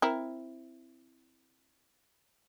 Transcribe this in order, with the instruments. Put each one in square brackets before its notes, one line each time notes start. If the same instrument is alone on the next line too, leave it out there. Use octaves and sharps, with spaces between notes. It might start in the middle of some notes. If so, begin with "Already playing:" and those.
[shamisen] C4 E4 A#4